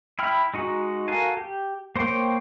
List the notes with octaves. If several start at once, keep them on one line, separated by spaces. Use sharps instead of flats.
E4 G5 B5 F6
G#3 D#4 F#4
F#4 A4 A#4 F5 G#5
G4
A#3 C5 C#5 G5